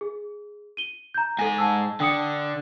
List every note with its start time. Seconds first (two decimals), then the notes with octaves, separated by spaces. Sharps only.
0.01 G#4
0.77 D#7 G7
1.14 A#5 G6
1.39 G#2 A4 G#5 A#6
1.58 A5 E6
2.00 D3 G5 D#6 C#7